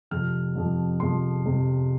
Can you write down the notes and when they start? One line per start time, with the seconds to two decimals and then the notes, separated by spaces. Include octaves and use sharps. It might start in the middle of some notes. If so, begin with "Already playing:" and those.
0.11 F2 C3 F3 F6
0.55 F2 C3 F3
1.00 F2 C3 F3 C6
1.45 F2 C3 F3